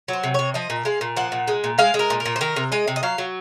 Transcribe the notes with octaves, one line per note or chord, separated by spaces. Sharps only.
F#3 C5
C3
C3 C#5
F3 D#5
A#2
G#3 F5
A#2
F3 F#5
A#2
G#3
A#2
G#3 F5
G#3
A#4
A#2
A#4
A#2
C5
D#3 A#4
C3
G#3 D#5
C3
D#5
F#3 F5
F#3